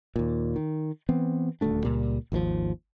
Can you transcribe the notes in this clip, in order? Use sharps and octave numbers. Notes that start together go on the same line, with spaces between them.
D#2 A#2
D#3
E3 B3 C4
D#1 D2 A3 D4
C#2 A#2 G3
G#1 D#2 D#3 F3